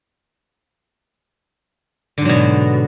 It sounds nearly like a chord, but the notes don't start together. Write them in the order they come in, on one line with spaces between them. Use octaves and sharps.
D3 G#2 F#3 B2